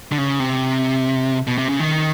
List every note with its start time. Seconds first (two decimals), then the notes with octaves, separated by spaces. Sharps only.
0.12 D3
0.18 C#3
0.40 C3
1.47 B2
1.58 C3
1.69 C#3
1.80 D#3